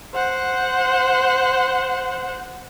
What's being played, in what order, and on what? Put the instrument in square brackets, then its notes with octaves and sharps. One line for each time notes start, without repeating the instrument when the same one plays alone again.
[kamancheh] C5 F#5